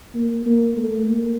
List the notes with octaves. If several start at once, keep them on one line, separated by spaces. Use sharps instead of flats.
A#3
A#3
A3
A#3